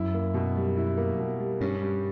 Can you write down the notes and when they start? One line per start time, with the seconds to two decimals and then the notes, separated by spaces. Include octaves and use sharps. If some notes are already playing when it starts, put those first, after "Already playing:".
Already playing: F#2 E4
0.14 A#3
0.34 B2
0.56 G3
0.76 E4
0.97 A#3
1.19 B2
1.40 G3
1.61 G2 C#4
1.82 G3